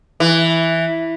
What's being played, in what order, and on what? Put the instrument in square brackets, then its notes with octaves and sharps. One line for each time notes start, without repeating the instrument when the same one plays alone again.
[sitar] E3